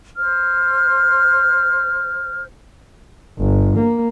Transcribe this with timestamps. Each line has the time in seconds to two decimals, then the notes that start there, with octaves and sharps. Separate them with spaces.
0.16 C5 F6
3.38 G1
3.77 A#3